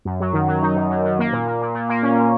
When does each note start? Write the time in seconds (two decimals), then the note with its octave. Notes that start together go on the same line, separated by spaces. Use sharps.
0.05 F#2
0.20 F#3
0.33 D#3
0.48 F#3
0.62 D#4
0.76 F#2
0.91 F#2
1.05 F#2
1.19 A#3
1.32 A#2
1.47 A#3
1.61 A#2
1.75 A#2
1.89 A#3
2.03 C#4
2.17 A#2